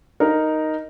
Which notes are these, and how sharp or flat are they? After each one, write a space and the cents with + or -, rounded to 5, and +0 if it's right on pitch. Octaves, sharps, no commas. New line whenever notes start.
D#4 +0 A#4 +0